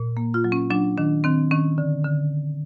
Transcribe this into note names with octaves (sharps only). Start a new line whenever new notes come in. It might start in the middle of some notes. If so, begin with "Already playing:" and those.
Already playing: A#2
A#3
F4
F#3
C#4
F#3 D4
D#3 D4
D#3 C4
D#3 C#4
D3
D3